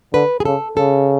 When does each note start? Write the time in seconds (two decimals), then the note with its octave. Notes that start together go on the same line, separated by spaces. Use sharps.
0.13 D3 B4
0.40 G#4
0.45 C#3 A4
0.77 C#3 A4